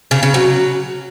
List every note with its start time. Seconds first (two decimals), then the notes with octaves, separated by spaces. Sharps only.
0.11 C#3
0.23 C#3
0.34 F#3